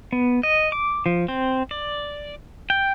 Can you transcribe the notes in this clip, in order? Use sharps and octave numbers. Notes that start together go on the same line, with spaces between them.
B3
D#5
D6
F3
C4
D5
G5